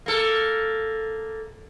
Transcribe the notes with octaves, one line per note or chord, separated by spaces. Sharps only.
A#3 A4